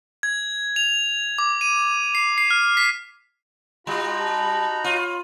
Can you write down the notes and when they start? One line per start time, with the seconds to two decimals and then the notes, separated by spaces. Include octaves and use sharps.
0.23 G#6
0.76 F7
1.38 D6
1.61 D#7
2.15 C7
2.38 C7
2.51 F6
2.77 B6
3.87 G3 D#4 F4 F#4 A#5 B5
4.20 A5
4.84 F4 C#5